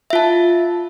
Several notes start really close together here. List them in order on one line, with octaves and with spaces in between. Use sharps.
E5 F4 A5